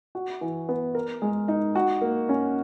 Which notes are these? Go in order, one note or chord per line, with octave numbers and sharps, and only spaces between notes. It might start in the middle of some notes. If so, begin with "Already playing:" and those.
F#4
E3
B3
A#4
G#3
D#4
F#4
A#3
C#4